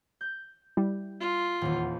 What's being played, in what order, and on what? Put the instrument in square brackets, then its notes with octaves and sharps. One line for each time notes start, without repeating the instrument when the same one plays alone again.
[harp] G6
[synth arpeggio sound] G3 E4
[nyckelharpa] F4
[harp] D#1 E2